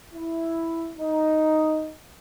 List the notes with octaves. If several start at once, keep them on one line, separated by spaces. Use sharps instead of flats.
E4
D#4